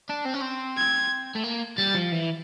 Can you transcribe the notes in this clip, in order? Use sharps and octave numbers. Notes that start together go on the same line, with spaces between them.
D4
C4
C#4
C4
G#6
A3
A#3
G3 A6
F3
E3